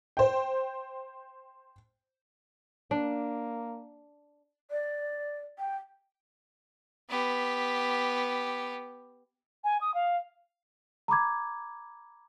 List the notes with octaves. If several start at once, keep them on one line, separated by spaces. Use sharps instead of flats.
C5 G5
A#3 D4
D5
G5
B3 G4
G#5
D#6
F5
A#5 B5 D6 G#6